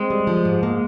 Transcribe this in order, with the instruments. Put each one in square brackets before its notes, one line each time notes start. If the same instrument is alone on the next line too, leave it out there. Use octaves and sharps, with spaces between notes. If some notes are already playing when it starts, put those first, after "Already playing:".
Already playing: [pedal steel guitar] G#3 [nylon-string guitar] C4
[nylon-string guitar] G3
F3
G#2
A#3